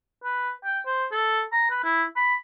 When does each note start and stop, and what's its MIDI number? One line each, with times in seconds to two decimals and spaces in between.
0.24 0.52 71
0.64 0.80 79
0.86 1.06 72
1.12 1.42 69
1.52 1.69 82
1.70 1.79 71
1.84 2.04 64
2.16 2.35 83